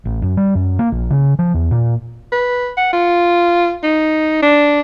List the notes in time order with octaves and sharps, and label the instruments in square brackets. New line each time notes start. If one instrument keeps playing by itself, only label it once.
[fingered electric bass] A1
F#2
G3
F#2
A#3
A#1
C#3
F3
E2
A#2
[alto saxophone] B4
F#5
F4
D#4
D4